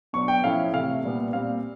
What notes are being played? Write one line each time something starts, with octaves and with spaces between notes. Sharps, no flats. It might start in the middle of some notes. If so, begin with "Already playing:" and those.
B2 F#3 B3 D4 C#6
G5
A2 F3 A3 C#4 E4 F5
C3 E3 A3 F5
A#2 G3 B3
A#2 G3 C4 F5